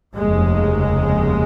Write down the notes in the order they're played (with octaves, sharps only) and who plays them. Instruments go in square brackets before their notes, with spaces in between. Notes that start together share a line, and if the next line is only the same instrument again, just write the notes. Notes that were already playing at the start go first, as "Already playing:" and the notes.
[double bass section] F1 D#2 C#3 G#3